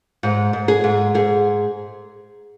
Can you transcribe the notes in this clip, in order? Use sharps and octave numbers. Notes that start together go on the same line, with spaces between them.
G#2
G#2
G#4
G#2
G#2 G#4